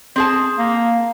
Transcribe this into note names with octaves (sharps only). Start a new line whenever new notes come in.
C4 G#4 A5
A#3